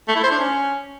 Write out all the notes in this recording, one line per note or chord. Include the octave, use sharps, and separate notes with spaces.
A3
E4
C5
D4
C#4